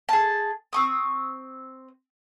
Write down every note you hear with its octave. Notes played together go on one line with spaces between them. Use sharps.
G#4 A5
C4 C#6 D#6